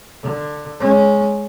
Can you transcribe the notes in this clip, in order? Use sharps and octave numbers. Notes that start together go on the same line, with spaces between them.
D3
G#3 C#4